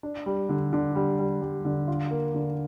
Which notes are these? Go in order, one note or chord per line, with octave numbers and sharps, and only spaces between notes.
D4
G3
D3
D3
G3
G3
G3
D3
F4
A#3
D3